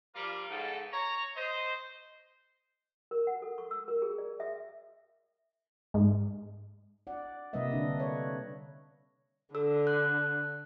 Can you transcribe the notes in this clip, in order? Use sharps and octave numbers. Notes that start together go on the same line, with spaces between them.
F3 G3 A#3 F4 A#4
G#2 C#3 B3 D#4 A4
C#5 A#5
C5 D#5
A#4
F#5
A4
C#6
E6
A#4
G#4
D5
E5
G#2
D5 F#5
C3 G3 A#3 B4 D#5 E5
D3 D4 B4
B4 C#5
D3 A4 E6
F#6